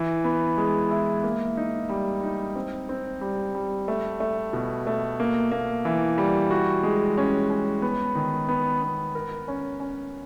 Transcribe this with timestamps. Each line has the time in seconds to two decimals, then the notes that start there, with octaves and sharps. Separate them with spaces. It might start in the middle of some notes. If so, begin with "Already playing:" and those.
Already playing: E3
0.24 B3
0.58 G#3
0.91 E4
1.23 A#3
1.57 D#4
1.89 G3
2.23 D#4
2.56 C4
2.89 C4
3.21 G3
3.55 G3
3.88 A3
4.20 A3
4.53 B2
4.87 A3
5.20 A#3
5.52 A#3
5.85 E3
6.18 G3
6.51 F#4
6.83 G#3
7.18 C#4
7.50 C#4
7.82 B3
8.15 D#3
8.49 B3
8.82 B3
9.15 A#4
9.48 C#4
9.80 C#4